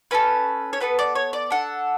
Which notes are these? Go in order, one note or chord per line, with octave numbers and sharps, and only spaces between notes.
C#4 E4 A4 B4
C#5
B3 F#4 A4 B4
D5
C#5
D5
D4 A4 F#5